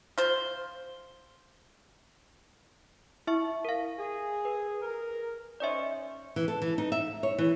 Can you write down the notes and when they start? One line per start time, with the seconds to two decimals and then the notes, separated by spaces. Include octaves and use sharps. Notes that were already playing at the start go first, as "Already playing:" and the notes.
0.18 F4 C5
3.27 E4 E5 C#6
3.65 A#4 F5
3.98 G#4
4.45 B4
4.82 A#4
5.60 C#4 D#4 C5 D5 E5
6.36 E3
6.48 A4
6.62 E3
6.78 D#4
6.92 E5
7.23 C#5
7.38 E3